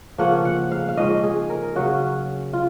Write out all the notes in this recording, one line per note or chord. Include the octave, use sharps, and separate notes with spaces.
C#3 F3 A#3 C#4 F#5
F#5
F5
F5
G#2 F3 A#3 C#4 D#5
G#4
A#4
C#3 F#3 C#4 F#4
F4